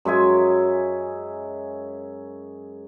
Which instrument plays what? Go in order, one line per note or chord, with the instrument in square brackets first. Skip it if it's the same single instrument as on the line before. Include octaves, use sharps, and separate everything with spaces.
[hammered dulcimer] F#2 G#3 E5 G#5